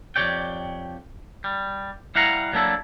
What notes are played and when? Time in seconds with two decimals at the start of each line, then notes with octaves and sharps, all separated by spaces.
0.16 F2 F3 G4 C#5 D5 G5
1.44 G3
2.15 G3 E4 F5 F#5 A#5
2.53 F#3 A#3 D4 E4 A4